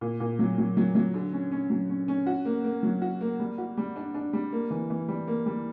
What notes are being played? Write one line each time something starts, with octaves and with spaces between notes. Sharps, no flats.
A#2
A#2
F#3
F#3
F#3
F#3
D3
C#4
C#4
F#3
C#4
C#4
F#4
A#3
A#3
F#3
F#4
A#3
G3
F#4
G3
D4
D4
G3
A#3
E3
E3
G3
A#3
G3